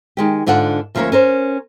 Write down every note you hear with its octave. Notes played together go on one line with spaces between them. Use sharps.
D#3 G#3 G4
G#2 D3 D4 F4 F#5 A5
D2 F3 A#3 C#4 A#4 C#5
C#4 A#4 C5